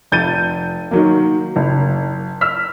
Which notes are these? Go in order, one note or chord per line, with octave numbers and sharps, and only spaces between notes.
F1 G6 A6 D#7
D#3 F#3 A#3
F#1
E6 F6 B6